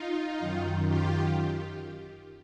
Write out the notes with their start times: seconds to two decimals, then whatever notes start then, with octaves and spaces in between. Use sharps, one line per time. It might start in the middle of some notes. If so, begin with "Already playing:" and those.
Already playing: D#4 F4
0.40 F#2 D#3
0.87 F4 G4